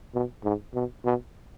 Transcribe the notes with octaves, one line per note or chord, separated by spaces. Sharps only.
B2
G#2
B2
B2